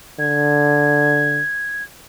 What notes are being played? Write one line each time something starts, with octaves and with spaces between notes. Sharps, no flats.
D3 G#6